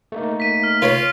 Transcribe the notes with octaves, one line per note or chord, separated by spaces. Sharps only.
A3 A#3 D#4
B6 D#7
F6
F4 B4 C#5 B5 D7